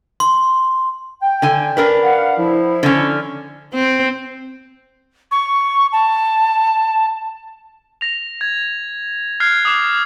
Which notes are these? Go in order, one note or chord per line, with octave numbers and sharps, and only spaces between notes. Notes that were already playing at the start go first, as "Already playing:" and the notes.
C6
G5
D3 G#5
D4 A#4 B4
F5 F#5
F3 E4
D3 C#4
C4
C#6
A5
A#6 F7
G#6
F6 F#6 G#6 C7
D6 D#6